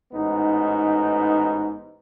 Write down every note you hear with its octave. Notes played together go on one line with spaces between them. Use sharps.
A1 G#2 B3 D#4